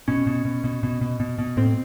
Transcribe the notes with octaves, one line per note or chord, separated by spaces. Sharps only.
B2 C#4
B2
B2
B2
B2
B2
B2
B2
A2 C4